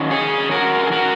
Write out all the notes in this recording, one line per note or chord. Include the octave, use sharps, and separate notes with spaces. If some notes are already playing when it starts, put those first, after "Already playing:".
Already playing: D#3 F#3 C#4
G#4 C#5
F#4 A#4
G#4
F#4 A#4